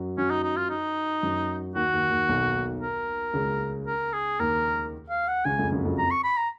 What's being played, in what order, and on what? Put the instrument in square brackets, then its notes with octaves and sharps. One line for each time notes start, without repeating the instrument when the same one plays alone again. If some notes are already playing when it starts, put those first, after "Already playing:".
Already playing: [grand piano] F#2 F#3
[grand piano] F#2 F#3 [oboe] C#4
[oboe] D#4
D#4
F4
D#4
[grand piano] F#2 F#3
[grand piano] D#2 D#3 [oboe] F#4
[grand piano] D#2 D#3
D#2 D#3
B1 B2
[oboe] A#4
[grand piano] C#2 C#3
[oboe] A#4
G#4
[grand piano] D#2 D#3 [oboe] A#4
[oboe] F5
F#5
[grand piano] C#2 C#3 [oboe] G#5
[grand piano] F2
F#2
F2
[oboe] A#5
C#6
B5
A#5